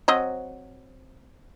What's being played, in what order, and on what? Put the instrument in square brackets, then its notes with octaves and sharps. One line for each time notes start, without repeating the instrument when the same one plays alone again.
[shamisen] F#3 C4 D#5